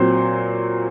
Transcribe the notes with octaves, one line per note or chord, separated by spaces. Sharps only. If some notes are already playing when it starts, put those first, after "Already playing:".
Already playing: A#2 F#3 C4 C5